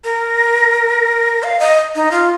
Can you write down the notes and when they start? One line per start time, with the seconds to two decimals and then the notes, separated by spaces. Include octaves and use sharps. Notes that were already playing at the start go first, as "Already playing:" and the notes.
0.04 A#4
1.43 F5
1.60 D#5
1.95 D#4
2.11 F4